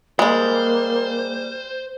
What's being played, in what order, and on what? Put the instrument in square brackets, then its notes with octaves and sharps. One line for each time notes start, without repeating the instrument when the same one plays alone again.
[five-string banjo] G3 G#3 [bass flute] A#3 [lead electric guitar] C5